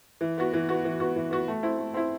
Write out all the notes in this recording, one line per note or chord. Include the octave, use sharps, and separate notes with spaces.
E3
B3 F#4
E3
B3 F#4
E3
B3 F#4
E3
B3 F#4
A3
C4 E4
A3
C4 E4